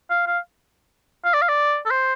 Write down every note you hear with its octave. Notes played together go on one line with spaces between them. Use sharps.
F5
F5
F5
D5
F5
D5
A4
C5